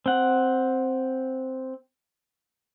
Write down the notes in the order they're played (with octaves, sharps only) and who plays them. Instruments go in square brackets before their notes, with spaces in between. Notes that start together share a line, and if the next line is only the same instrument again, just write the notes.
[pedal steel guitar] C4 F#5